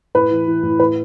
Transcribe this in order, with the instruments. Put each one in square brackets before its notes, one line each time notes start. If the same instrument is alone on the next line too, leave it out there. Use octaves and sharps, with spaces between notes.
[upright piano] A2 B4
E3
E3
A2
A2 B4